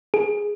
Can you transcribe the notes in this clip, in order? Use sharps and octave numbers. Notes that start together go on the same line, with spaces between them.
G#4